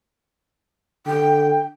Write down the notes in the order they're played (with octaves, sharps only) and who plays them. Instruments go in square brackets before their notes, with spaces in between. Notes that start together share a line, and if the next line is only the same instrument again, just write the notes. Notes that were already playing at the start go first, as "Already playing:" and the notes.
[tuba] D3 [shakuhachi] G5